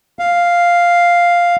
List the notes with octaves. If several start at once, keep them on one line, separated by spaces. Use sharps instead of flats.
F5